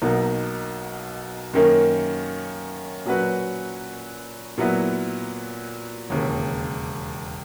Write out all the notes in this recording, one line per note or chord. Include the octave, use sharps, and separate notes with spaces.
B1 B2 F#3 A#3 D#4
F#2 D#3 A#3 C#4
A#2 F#3 C#4 F#4 B4
A#2 F#3 B3 E4
E1 D#2 C#3